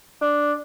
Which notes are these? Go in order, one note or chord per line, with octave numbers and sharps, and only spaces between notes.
D4